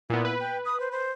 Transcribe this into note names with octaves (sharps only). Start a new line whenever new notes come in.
A#2 B3 E4
B4
G5
D#6
C5
C5